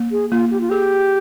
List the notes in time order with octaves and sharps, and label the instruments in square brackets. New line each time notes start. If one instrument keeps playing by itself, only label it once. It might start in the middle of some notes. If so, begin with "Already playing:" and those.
Already playing: [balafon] A#3
[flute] G#4
[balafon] A#3 [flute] F4
[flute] G4
F4
[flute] G4 [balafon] G#4